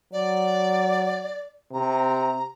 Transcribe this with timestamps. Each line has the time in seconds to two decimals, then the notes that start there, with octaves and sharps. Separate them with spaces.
0.13 F#3 D5
1.73 C3 A#5